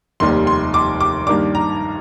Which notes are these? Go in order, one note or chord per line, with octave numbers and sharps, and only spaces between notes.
F1 D#2 D#3 G3 C6
C6
D6
D6
G2 D#3 A#3 D4 D6
A#5